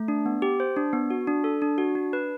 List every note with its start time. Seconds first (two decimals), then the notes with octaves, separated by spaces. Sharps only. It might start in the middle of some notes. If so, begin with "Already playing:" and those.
Already playing: A3
0.08 D4
0.26 B3
0.42 G4
0.60 C5
0.76 D4
0.93 B3
1.10 F#4
1.27 D4
1.44 A4
1.62 D4
1.78 F#4
1.95 D4
2.13 B4